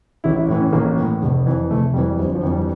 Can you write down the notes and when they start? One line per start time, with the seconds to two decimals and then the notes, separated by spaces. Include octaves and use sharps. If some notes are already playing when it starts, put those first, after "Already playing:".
0.24 A1 E4
0.36 E4
0.48 A2 E3
0.61 C#4
0.73 A1 A#3
0.97 A2 E3
1.22 F1
1.46 F2 E3
1.71 F1 A3
1.94 F2 E3 G3
2.08 G3
2.18 G1 F3
2.35 F3
2.43 F2 E3
2.51 G3